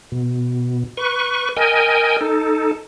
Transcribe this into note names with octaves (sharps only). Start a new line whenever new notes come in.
B2
B4 C#6
A#4 D#5 G5 G#5
D#4 A4